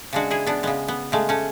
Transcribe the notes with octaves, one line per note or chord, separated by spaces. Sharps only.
C#3 G#3 D4 F#4
E4 G#4
B3 D4
C#3 G#3 B3
B3
C#3 G#3 A3
A3 C#4